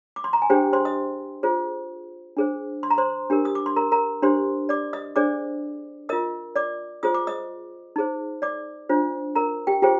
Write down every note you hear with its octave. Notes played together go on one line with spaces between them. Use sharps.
D6
C6
A#5
G#5
D4 G4 G#4 C5 G5
C5 C6
D#5 D#6
F4 G#4 C5
D4 G#4 C5
C6
A#5
C5 C6
D4 G4 A#4
D#6
D6
C6
A#4 A#5
A#4 A#5
D4 G4 C5 C6
D5 D6
D#5 D#6
D4 G#4 C5 D5 D6
F4 A#4 D#5 D#6
D5 D6
F4 G#4 C5 D#6
D6
D#5 D#6
D#4 G#4 C5
D5 D6
D4 F4 C5
A#4 A#5
G4 G5
F4 G4 G#4 C5 G5